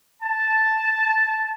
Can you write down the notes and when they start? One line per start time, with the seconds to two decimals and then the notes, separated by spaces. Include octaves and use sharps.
0.23 A5